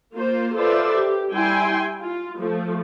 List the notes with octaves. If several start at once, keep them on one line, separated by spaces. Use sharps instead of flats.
A#3 F4 C5
F4 A4 B4 C5 D5 E5
G4
G3 E4 G5 G#5 C6
F4
F3 A3